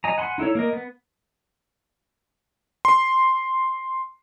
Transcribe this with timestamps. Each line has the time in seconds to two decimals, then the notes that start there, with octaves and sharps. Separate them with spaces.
0.04 D#5 G#5 A#5
0.18 F#5 G#5 B5 C6
0.38 D#4 E4 A4 C#5
0.55 A#3 A#4 D#5
0.73 B3
2.85 C6